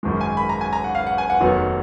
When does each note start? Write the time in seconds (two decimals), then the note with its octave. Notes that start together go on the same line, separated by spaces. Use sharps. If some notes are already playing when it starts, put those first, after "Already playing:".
0.03 G#1 F#2 D#3 G#3
0.21 G#5
0.37 B5
0.49 A#5
0.61 G#5
0.73 A#5
0.84 F#5
0.95 F5
1.07 F#5
1.18 G#5
1.30 F#5
1.40 F1 D#2 D#3 F#3 B3